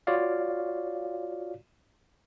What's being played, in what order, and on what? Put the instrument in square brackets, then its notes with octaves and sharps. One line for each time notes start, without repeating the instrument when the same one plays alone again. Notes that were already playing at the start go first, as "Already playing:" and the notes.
[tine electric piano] F4 F#4 C#5 D5 F5